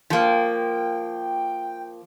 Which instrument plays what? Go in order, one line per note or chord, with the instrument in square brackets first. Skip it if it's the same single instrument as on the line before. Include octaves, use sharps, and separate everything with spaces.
[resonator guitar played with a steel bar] F3 A#3 [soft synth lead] G5